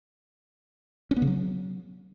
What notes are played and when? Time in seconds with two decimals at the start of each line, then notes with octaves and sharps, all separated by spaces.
1.11 C#4
1.16 B3
1.22 C#3
1.27 F#3